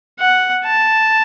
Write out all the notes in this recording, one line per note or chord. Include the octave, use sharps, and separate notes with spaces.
F#5
A5